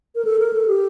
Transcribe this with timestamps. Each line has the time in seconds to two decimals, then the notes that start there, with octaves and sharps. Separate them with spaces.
0.15 A#4
0.25 A4
0.39 A#4
0.53 A4
0.68 G4